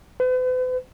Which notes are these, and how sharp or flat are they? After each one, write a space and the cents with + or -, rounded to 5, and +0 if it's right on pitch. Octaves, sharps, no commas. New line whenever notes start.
B4 +45